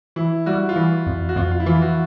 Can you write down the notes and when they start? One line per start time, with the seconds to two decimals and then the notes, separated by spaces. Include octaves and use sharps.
0.16 E3 E4
0.46 G3 F#4
0.69 F4
0.76 E3 F#4
1.06 F2
1.29 F#4
1.36 F2 F4
1.52 F4
1.60 E4
1.66 E3 F4
1.82 F#4